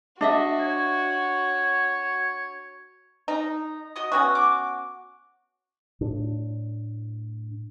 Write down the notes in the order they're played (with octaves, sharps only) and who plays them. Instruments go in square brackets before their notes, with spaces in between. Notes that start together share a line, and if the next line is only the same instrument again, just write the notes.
[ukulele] D4 D#5 E5 [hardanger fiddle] F#4
[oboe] C#5
[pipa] D#4
[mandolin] F#4 D#5 D#6
[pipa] B3 C#4 F#4 [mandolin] E6
[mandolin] D6
[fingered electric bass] A2 D4